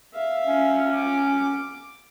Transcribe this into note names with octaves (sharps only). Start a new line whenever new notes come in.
E5 F5
C#4
D6